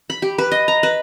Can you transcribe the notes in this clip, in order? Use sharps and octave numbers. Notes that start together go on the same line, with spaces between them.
B5
G4
B4
D#5
A#5
B4